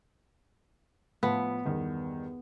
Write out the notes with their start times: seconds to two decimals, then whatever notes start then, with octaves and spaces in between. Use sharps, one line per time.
1.23 A2 F3 B3
1.65 E2 G2 D#3